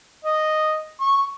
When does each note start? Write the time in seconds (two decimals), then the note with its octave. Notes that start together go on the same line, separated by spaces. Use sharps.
0.25 D#5
1.00 C#6